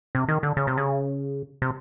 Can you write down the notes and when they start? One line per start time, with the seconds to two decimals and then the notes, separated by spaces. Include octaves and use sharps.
0.15 C3
0.29 D#3
0.43 D3
0.57 C#3
0.67 C3
0.77 C#3
1.62 C3